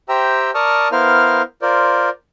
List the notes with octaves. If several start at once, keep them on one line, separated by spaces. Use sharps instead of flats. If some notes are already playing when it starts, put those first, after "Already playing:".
G4 C5 E5 G5 A#5 E6
A#4 D5 A5 C#6 D#6 F6
B3 E4 A#4 C5 F5 F6
F4 A#4 C5 D5